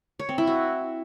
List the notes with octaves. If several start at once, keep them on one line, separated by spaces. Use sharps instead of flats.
C#5
C4
E4
F#4